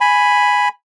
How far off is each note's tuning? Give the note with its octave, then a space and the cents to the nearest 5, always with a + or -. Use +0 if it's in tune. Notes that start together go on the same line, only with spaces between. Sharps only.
G#5 +0 B5 +0